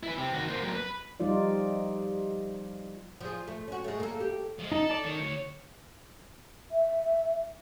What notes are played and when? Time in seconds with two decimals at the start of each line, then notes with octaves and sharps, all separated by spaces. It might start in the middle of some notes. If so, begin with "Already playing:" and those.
0.03 E4 B4
0.18 C4 G4
0.33 D#3 F#4
0.49 A#3 C5
0.63 F#3 A#3
0.75 B4
1.20 F3 G3 D#4 F4 D5
3.21 F3 G#4
3.47 A3
3.68 C#4 F#4
3.84 G#3 A3
4.00 A#3 A4
4.20 G4
4.59 F3 G#3
4.72 D#4 A4
4.90 D5 A5
5.05 D#3 C#5
5.21 D2
6.72 E5